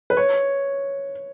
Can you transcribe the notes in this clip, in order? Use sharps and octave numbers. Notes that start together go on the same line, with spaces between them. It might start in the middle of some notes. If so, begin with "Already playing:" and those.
B4
C#5